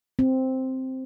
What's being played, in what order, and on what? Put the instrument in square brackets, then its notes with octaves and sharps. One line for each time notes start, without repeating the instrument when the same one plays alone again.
[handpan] C4